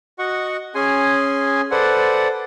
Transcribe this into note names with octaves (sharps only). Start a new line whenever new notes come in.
F#4 D#5 F#5 C#6
C#4 G#4 G#5 C6
A4 B4 C5 D5 F#5